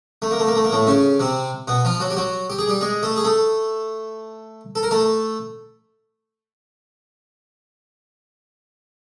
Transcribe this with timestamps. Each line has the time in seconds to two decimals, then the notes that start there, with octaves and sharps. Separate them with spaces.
0.22 A3
0.31 A#3
0.39 A3
0.47 A#3
0.55 A3
0.64 A#3
0.72 A2 A3
0.87 C#3 C#4
1.19 C3 C4
1.68 B2 B3
1.85 F3 F4
2.00 F#3 F#4
2.10 G4
2.17 F#3 F#4
2.50 G4
2.59 G#4
2.68 G3 G4
2.81 G#3 G#4
3.03 A3 A4
3.16 G#4
3.24 A3 A4
4.75 A4
4.83 A#4
4.91 A3 A4